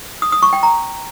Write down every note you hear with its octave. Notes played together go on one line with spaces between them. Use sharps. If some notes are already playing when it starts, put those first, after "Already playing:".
D#6
D#6
C#6
G5
A#5